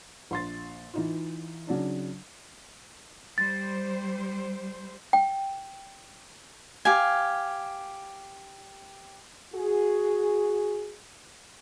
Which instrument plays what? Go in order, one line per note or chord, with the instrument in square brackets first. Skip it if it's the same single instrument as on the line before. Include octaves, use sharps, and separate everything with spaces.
[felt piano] A#1 C6 A6
E3 D#4 F4
C#3 F#3 D4 D#4
[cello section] G3 C5 [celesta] A6
[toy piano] G5
[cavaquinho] G4 F5 G#5
[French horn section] F#4 G#4